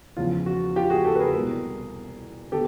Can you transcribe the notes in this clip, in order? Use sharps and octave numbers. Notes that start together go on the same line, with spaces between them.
E2 C#3 F3 F4
F#4
F4 G4
F#4 G#4
G4 A4
B4
G#4 A#4
C2 B2 G#3
D3 B3 G4 A4